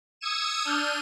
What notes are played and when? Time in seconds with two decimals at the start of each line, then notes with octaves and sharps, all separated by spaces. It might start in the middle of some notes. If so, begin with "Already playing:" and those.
0.21 D#6 E6 G#6 C#7 D#7 E7
0.65 D4 F6 G6 D#7